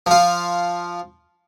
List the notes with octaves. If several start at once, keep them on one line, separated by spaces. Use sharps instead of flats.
F3 F4